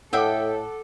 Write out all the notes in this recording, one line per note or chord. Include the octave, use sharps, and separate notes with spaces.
A2 A4 D#5 E5 F#5 G5 D6